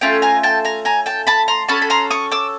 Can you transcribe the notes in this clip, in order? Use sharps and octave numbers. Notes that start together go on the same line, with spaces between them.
A3 C#4 F4 G5 A5
G#5 A#5
G5 A5
G#5 A#5
G#5 A#5
G5 A5
A5 B5
A#5 C6
C#4 F#4 A4 A5 B5
B5
A#5 C6
C#6 D#6
D6 E6